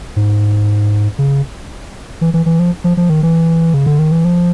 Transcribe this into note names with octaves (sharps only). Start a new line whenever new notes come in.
G#2
C#3
E3
E3
E3
F3
F3
F3
D#3
E3
C#3
D3
D#3
E3
F3